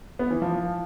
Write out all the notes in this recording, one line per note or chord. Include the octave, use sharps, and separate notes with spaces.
B3
E3
F3